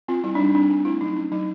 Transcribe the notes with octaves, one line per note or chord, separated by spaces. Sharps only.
C4 F4
G3 E4
D4
G3 D#4
C4 D4
C4
A3 E4
F#3 D#4
C#4
F#3 D#4